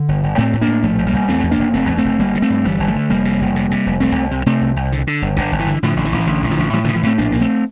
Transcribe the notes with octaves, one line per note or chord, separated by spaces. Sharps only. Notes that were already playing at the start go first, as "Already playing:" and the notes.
Already playing: D3
G1
G1
A2 A3 C4
A2
A#3 D4
A2
A#1 F3 A3
A#1
G3 A#3
A#1
E2 A3 C4
E2
A#3 D4
F1
F1 A3 C4
E2
A3 C4
F1
G1 G3 A#3
D3
A3 C4
G2
G1 E3 G3
G1
F3 A3
D3
F1 G3 A#3
C3
F1
C3
C3
F1
C2 A3 C4
C2
C3
C3 A3 C4
C2
C2
D3
D3
G1
G1 D3
G1
E3
D3
A2 D3 F3
A1
E3
A1
E3
A1 D3
A1
D3 F3
A1
A2 E3 G3
A2 D3 F3
E3
A2 A3 C4
A#1 A#3 D4
A#1 A#3
A3 C4